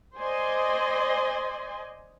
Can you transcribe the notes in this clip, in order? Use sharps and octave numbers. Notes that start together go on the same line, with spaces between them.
C5 D5 D#5 G#5 C6